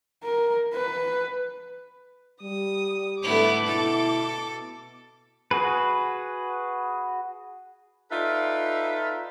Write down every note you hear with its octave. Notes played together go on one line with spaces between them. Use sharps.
A#4
B4
G3 D#6
G#2 D3 A3 B3 E4 D6
B2 E4 A4
F#4 G#4 B4
D#4 F4 A4 B4 D5 E5